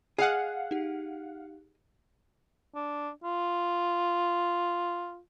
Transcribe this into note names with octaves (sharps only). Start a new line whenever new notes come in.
G#4 D#5 F5 F#5
D#4 G4
D4
F4